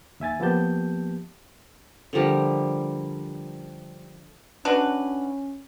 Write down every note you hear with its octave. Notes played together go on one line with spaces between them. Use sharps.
D#2 E5 G#5 A6
F3 A#3 B3 G4 A5 G6
D3 F3 G3 A#4
C#4 D4 F#4 B4